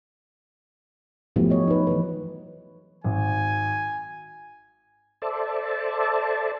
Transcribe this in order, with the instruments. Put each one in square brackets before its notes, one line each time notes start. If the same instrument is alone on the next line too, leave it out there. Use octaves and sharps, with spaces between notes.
[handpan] F3 F#3 A3 B3 E4 G4
C#5 D#5
D#4 B4
E3 B4
[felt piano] G#1 [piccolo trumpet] G#5
[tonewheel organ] A4 C5 D5 E5 A5